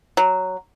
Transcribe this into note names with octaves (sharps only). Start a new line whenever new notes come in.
F#3